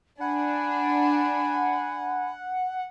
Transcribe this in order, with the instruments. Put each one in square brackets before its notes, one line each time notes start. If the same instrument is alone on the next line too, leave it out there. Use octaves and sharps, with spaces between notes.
[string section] D4 [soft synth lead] F#5 [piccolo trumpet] G#5 [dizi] B5